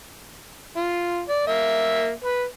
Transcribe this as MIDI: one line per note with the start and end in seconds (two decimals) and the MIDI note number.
0.76 1.22 65
1.29 1.43 74
1.47 2.11 58
1.47 2.11 76
2.24 2.44 71